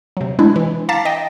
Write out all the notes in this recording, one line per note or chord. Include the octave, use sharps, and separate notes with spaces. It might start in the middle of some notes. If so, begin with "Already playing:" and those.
C3 F#3
G#3 D4 E4
E3
F5 A5 A#5 D6 A6 B6
D#5 G5